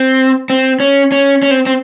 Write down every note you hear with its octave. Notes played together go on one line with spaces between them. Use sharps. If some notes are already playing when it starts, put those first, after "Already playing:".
Already playing: C4
C4
C#4
C#4
C#4
C4
C4